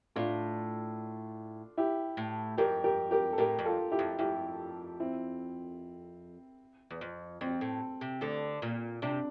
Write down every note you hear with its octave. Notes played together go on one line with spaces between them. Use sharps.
A2 D4 F4
E4 G4
A2
F2 G4 A#4
G4 A#4
G4 A#4
A4
A2 G4 A#4
F2
F4 A4
E4 G4
F2
F2 E4 G4
C4 E4
E2
F2
F2 C4
A2
C3
D2 D3
A#2
C3 D4